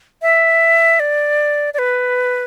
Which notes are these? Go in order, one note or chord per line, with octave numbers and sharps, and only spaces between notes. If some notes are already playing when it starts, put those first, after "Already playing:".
E5
D5
D5
B4